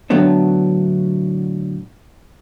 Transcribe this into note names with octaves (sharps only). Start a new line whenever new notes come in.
A2 D3 F#3 A3 B3 D4